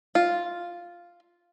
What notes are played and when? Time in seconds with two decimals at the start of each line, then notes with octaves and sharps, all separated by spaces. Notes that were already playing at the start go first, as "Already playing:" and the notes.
0.15 F4